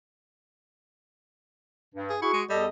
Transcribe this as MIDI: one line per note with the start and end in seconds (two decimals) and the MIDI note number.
1.95 2.13 43
2.10 2.19 68
2.22 2.29 64
2.22 2.41 66
2.22 2.41 68
2.22 2.41 85
2.33 2.43 56
2.49 2.67 40
2.49 2.66 55
2.49 2.67 69
2.49 2.67 75